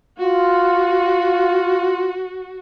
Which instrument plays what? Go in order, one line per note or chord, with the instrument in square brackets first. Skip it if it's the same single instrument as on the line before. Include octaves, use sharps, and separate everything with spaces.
[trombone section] F4 [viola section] F#4